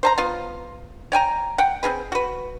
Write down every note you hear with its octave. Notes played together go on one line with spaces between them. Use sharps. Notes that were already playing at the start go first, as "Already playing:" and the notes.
C5 A5 A#5
B3 F4
C#5 G5 G#5 A#5
F#5 G5
C4 F4 G#4 B4
F#4 B4